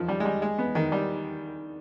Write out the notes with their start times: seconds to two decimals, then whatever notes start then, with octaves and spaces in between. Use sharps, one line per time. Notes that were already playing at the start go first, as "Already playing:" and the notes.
Already playing: D#3 F3
0.08 G3
0.20 G#3
0.25 G3
0.42 G#3
0.58 B3
0.75 D#3
0.92 G3